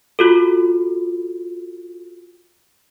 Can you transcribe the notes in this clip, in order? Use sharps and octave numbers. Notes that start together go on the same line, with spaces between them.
F4 F#4 A4